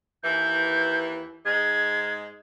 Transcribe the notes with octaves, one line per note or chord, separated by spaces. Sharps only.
D#2 E3 G6
G#2 G#3 G#6